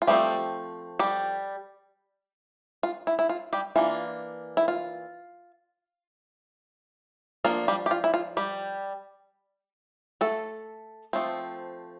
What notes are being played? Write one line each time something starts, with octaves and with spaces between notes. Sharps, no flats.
F4
F3 G3 A3 C4 G4
G3 G4
F4
E4
E4
F4
G3 G4
E3 A#3 D4 F4
E4
F4
F3 A#3 D4 F4
G3 G4
G4
F4
E4
F4
G3 G4
A3 A4
F3 A3 C4